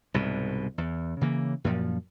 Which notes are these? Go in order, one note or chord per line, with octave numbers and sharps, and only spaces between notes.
C2 G#2 B2
E2
C#3 E3 A#3
F#2 A#2 F3